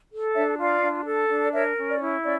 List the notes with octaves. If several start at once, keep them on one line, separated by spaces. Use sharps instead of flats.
A4
D4 C#5 E5
F4 D5 F5
D4
A4
D4
D5
A#4 C#5 E5
C#4
D5
E4
C#4 D5